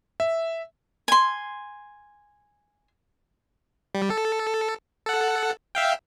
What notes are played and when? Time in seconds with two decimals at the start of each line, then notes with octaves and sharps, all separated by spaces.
0.20 E5
1.08 G#5 C6
3.95 G3
4.10 A4
5.06 A4 F#5
5.75 E5 F5 G5